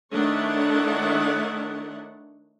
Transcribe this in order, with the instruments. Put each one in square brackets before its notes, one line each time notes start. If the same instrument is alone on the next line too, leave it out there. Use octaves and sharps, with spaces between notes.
[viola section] D#3 A3 D4 E4 C#5 F#5